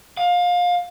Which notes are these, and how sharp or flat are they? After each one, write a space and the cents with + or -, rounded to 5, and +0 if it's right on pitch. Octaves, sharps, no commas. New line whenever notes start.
F5 +25